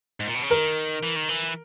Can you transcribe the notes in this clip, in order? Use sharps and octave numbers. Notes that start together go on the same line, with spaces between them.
G#2
A#2
B2
C#3
D#3 A#4
E3
D#3
E3